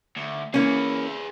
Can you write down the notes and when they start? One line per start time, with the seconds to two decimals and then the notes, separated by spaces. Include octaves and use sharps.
0.17 D2
0.54 E3 A#3 C#4 G#4 B4